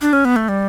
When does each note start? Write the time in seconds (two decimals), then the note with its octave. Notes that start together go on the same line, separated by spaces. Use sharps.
0.02 D4
0.13 C#4
0.25 B3
0.36 A3
0.49 G3